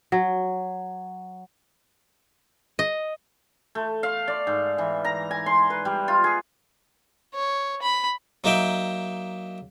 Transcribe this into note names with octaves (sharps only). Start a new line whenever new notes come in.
F#3
D#5
A3
F5
D5
G#2
E3
A#5
G#5
C6
B4
G3
F4
G#4
C#5
B5
F#3 A#3 D#4 E5 G5